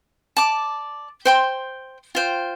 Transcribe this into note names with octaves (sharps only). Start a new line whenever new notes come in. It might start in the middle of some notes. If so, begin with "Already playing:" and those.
D5 A5 D6
C5 G5 C6
F4 C5 G5